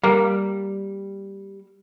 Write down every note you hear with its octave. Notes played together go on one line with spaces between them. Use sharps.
G3 A#3